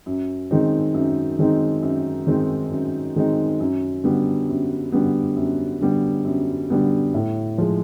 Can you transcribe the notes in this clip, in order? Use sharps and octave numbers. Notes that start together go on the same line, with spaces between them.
F#2
D#3 G#3 C4 D#4
F#2
D#3 G#3 C4 D#4
F#2
D#3 G#3 C4 D#4
F#2
D#3 G#3 C4 D#4
F#2
D3 G3 B3
F#2
D3 G3 B3
F#2
D3 G3 B3
F#2
D3 G3 B3
A2
F3 G#3